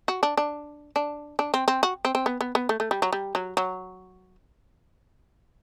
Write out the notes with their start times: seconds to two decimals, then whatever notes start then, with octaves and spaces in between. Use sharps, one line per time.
0.08 F#4
0.23 D4
0.37 D4
0.96 D4
1.39 D4
1.54 C4
1.68 C4
1.83 F#4
2.05 C4
2.15 C4
2.26 B3
2.41 B3
2.55 B3
2.69 A3
2.80 A3
2.91 G3
3.02 F#3
3.13 G3
3.35 F#3
3.57 F#3